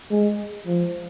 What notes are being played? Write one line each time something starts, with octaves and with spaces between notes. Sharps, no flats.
G#3
F3